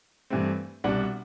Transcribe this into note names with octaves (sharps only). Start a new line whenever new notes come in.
G2 E3 A3 C4
C2 B2 G3 D4 F#5